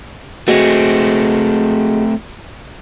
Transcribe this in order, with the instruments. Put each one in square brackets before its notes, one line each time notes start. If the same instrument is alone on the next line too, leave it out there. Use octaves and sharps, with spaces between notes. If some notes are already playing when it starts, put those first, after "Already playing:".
[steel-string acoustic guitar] G#3 F#4 [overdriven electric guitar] A3 C4